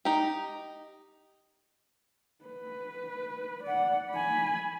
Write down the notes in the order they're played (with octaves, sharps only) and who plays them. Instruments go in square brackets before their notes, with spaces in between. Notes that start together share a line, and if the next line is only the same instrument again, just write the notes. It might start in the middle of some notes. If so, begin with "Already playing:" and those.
[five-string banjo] D#4 G4
[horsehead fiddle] B4
D5 F#5
G#5 B5